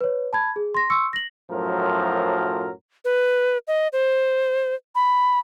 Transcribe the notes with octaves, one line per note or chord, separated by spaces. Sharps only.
B4 C#5
A5 B5 G#6
G#4
C6 A#6
C6 C#6 E6 C#7
A#6 F#7
F#2 A2 F3 F#3 A#4 C5
B4
D#5
C5
B5